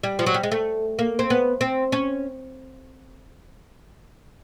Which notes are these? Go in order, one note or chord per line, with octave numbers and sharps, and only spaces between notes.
G3
F3
F#3
G3
G#3
A3
A#3
C4
B3
C4
C#4